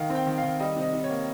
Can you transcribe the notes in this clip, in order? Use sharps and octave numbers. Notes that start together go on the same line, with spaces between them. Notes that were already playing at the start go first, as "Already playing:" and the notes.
Already playing: D#3 F5
C4
G5
D#3
F5
D#3
G3 D#5
C3
D#5
C3
C#5
A#3